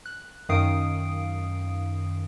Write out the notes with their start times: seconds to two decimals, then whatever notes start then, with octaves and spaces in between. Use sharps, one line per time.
0.06 F#6
0.49 F#2 D#3 F5 D#6 C7 D7